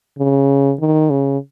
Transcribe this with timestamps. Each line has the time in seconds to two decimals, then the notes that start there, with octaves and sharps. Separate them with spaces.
0.18 C#3
0.80 D#3
1.10 C#3